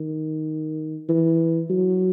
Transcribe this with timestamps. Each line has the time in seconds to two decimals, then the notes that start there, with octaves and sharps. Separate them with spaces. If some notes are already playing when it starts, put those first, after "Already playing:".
Already playing: D#3
1.09 E3
1.70 F#3